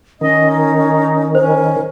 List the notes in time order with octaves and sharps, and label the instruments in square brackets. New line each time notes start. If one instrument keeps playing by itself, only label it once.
[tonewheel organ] D#3 [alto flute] C#4 [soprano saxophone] D#5
[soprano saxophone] D#4
[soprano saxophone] C#4 [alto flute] A#4 [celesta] C5